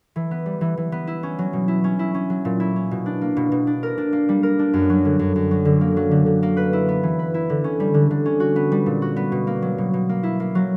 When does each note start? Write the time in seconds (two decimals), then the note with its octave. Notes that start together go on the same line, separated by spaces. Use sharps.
0.16 E3
0.31 B3
0.46 G3
0.61 E3
0.77 E3
0.92 B3
1.07 E4
1.23 C#4
1.39 F#3
1.53 B2
1.68 E4
1.84 C#4
1.99 E4
2.14 C#4
2.30 F#3
2.45 A#2
2.60 E4
2.76 C#4
2.91 B2
3.06 D4
3.21 A#3
3.37 B2
3.52 B2
3.67 D4
3.83 A#4
3.98 D4
4.13 A#3
4.29 G3
4.43 A#4
4.59 D4
4.73 F#2
4.89 F#3
5.05 D3
5.19 F#2
5.36 F#2
5.51 F#3
5.65 D3
5.81 A#3
5.97 F#3
6.11 D3
6.26 D3
6.43 A#3
6.57 B4
6.73 E4
6.88 B3
7.03 E3
7.19 B4
7.34 E4
7.50 D3
7.64 C#4
7.80 G3
7.94 D3
8.11 D3
8.26 C#4
8.40 F#4
8.56 B3
8.72 G3
8.86 A#2
9.02 F#4
9.16 B3
9.32 B2
9.47 A#3
9.62 F#3
9.78 B2
9.94 B2
10.09 A#3
10.23 E4
10.40 A#3
10.55 F#3